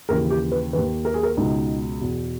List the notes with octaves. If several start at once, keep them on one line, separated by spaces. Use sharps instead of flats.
D#2 C#3 E3 A#4
G4
B4
D#2 D#3 B4
A#4
G#4
A#4
C#2 B2 D#4
E2 B2